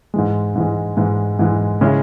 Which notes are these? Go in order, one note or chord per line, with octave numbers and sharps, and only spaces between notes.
G#2 E3 G#3
G#2 E3 G#3
G#2 E3 G#3
G#2 E3 G#3
C#3 G#3 C#4 E4